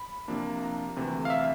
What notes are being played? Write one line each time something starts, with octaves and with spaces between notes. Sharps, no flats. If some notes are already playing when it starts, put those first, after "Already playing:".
Already playing: B5
C3 F3 A#3 D4
A#5
D2 C3 E3 A3
F5
E5